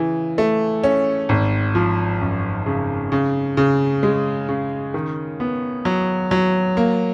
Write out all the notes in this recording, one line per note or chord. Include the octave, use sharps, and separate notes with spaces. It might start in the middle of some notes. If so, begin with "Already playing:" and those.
Already playing: C#3 E3
A3
C#4
G#1
F3
F#2
C#3
C#3
C#3
G#3
C#3
D#3
B3
F#3
F#3
A#3